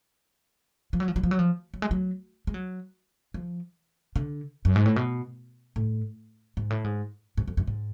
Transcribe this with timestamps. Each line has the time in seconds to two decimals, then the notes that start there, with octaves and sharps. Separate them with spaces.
0.93 F3
1.00 F#3
1.08 F3
1.16 F#3
1.23 F3
1.31 F#3
1.39 F3
1.74 F#3
1.82 G#3
1.91 F#3
2.47 G#3
2.54 F#3
3.34 F3
4.16 D3
4.65 F#2
4.76 G#2
4.86 A2
4.96 B2
5.76 A2
6.57 G#2
6.70 A2
6.84 G#2
7.37 G#2
7.48 F2
7.57 F#2
7.67 G#2